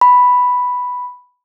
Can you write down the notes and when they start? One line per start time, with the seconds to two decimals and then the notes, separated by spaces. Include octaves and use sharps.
0.01 B5